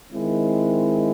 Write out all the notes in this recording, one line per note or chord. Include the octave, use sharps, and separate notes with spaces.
D#3 G#3 C4 E4